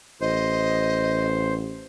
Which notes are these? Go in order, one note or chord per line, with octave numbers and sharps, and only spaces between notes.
A1 C5 D#5